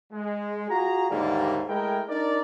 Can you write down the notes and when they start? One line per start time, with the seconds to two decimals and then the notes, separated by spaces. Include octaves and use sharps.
0.12 G#3
0.70 F4 F#4 G#4 A#5
1.11 D#2 G#2 D3 G3 A3 A#3
1.69 G#3 A3 E4 A#4 G5
2.09 D4 D#4 A#4 D5